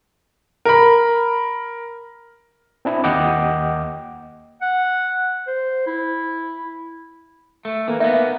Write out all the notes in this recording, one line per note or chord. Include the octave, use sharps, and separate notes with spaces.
A#4 B5
C4 D4 E4
D#2 D#5 F#5 G5 D6
F#5
C5
E4
A3
E3 A#3
B3 D#4 E5